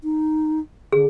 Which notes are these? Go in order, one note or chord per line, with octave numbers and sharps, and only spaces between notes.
D#4
D3 G#4